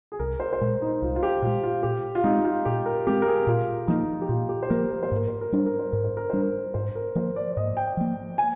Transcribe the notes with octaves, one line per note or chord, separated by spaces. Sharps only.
G#4
C2 A#4
C5
C5
A#2 G#3 A#4
D#4
C2 F4
F4
G4
A#2 G#3 F4
F4
A#2 G4
F4
G#3 C4 D#4
F4
A#2 G4
A#4
G#3 C4 G4
A#4
G#4
A#2 F4
F3 A#3 D#4
G4
A#2 F4
G4
C5
F3 A#3 A#4
A#4
C5
G#2 A#4
C5
A#4
G3 D4 C5
A#4
C5
G#2 A#4
C5
A#4
G3 D4 C5
A#4
G#2 C5
A#4
F3 A#3 C5
D5
D5
G#2 D#5
G5
F3 A#3
G#5